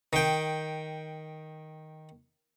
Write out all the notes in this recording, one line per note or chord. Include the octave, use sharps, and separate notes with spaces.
D#3 G5